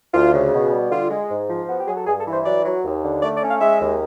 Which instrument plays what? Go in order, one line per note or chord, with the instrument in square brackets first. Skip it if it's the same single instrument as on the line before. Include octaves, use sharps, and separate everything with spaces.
[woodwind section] D2 F4
C#3
B2
G3
D3 F4
G#3
G#2
F3
B3 F#4
G4
F#3 G#4
A4
G2 G#4
A4
E3
C5
F#3 D5
F#3
D#2
D3
A3 D5
D5
C#4
F5
G#3 E5
D#2